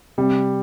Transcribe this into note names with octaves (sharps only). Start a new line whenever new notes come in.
C3 G3